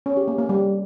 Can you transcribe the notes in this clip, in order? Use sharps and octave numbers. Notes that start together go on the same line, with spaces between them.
C#4
G4
A#3
A#3
G3